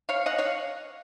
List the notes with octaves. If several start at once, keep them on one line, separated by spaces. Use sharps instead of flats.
C#5 F5
D#5 F#5
C#5 F5